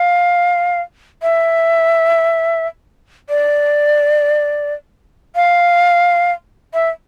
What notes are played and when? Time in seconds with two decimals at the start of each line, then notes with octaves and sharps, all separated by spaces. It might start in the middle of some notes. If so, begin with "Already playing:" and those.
Already playing: F5
1.22 E5
3.29 D5
5.36 F5
6.74 E5